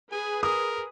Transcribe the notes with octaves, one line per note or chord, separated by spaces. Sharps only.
G#4 B4 G#5
A#4 D#6